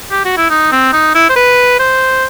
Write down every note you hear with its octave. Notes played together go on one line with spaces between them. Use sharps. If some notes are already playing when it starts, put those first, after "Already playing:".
G4
F#4
E4
D#4
C4
D#4
E4
C5
B4
C5